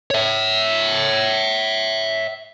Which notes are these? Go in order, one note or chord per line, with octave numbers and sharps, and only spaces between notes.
C#5 E5